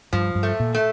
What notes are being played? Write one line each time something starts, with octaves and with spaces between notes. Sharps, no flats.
G2 F3
G2
A3
A#2
A3